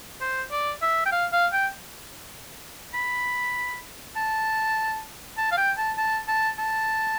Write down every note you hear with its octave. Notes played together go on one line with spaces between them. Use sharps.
C5
D5
E5
G5
F5
F5
G5
B5
A5
A5
F5
G5
A5
A5
A5
A5